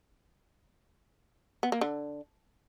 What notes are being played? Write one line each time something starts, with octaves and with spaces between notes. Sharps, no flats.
B3
A#3
D3